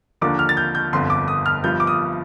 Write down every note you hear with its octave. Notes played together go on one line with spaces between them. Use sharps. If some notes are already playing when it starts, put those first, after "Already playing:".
D#2 D3 F3 A#3 D4 D6
F6
A6
G6
G6
G1 F2 D3 C6
D6
D#6
F6
G1 G2 F3 G6
D6
D#6